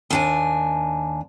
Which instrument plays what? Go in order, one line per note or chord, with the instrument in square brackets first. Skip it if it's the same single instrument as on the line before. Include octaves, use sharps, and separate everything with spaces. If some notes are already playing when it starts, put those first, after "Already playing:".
[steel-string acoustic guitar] D#2 D4 G#5